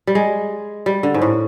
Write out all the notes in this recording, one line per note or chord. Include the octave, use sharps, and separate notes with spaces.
G3
G#3
G3
D3
G#2
A2